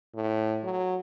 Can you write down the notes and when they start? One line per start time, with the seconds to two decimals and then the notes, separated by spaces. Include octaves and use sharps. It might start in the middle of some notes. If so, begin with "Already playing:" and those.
0.15 A2
0.63 F#3